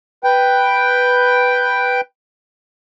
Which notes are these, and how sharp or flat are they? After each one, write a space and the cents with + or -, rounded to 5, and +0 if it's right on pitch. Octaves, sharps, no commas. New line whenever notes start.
B4 +0 G5 +0